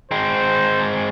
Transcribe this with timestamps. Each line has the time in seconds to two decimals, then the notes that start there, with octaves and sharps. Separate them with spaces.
0.11 G#3 C4 C5